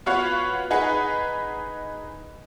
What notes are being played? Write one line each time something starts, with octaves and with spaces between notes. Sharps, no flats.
B3 F4 F#4 B4 C#5 F5
D#4 G#4 B4 F#5